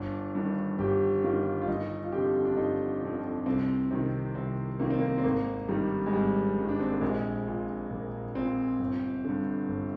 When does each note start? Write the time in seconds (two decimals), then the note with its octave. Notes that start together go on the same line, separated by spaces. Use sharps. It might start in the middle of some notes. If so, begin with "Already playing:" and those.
Already playing: G1 D4
0.35 G2 D#3
0.79 G1 G4
1.23 G2 D#3 F4
1.61 F4
1.67 G1 D#4
2.03 F4
2.12 F2 D3 G4
2.45 D4
2.56 G1 D#4
3.02 F2 D3
3.46 C2 C4
3.91 C3 D#3
4.35 C2 C4
4.80 C3 D#3 A#3
4.90 C4
5.00 A#3
5.18 C4
5.23 G#1 A#3
5.68 G2 D#3 G3
6.06 G#3
6.12 G#1 G3
6.58 G2 D#3
6.68 D4
6.80 C4
6.91 A#3
7.01 A#1 G#3
7.47 A#2
7.90 A#1 A#3
8.35 A#2 C4
8.79 G1
9.24 G2 D3
9.69 G1